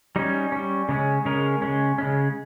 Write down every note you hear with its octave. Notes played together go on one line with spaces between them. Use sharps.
G3 C#4 D#4
G3 C#4
C#3 G#3 C#4
C#3 G#3 C#4 A#4
C#3 G#3 C#4
C#3 G#3 C#4